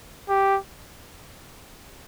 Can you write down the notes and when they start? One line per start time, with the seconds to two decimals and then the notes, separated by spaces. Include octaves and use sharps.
0.29 G4